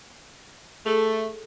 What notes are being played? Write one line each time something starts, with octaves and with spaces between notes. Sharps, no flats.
A3 G#4 A4